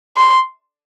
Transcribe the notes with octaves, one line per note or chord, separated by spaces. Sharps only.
C6